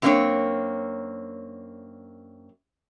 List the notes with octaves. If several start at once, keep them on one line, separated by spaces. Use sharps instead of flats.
F#2 F#3 A#3 C4 D4 C#5